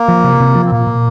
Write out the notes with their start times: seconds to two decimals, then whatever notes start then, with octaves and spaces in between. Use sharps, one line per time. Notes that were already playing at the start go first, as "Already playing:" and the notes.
Already playing: A#3
0.08 F3
0.24 C3
0.40 C3
0.55 F3
0.65 C4
0.72 A#2 A#3
0.87 A#2